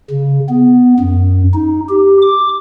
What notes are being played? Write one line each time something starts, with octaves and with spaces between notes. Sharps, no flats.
C#3
B3
F#2
D#4
G4
D6